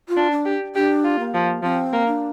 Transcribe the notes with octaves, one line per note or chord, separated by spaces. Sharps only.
F4
D4
D4
G4
D4 G4
F4
A#3
F3
F3 C4
A#3
D4